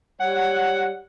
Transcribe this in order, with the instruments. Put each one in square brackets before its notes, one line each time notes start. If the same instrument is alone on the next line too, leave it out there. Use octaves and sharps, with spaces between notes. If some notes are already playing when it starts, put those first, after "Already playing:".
[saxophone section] G3 C#5 F#5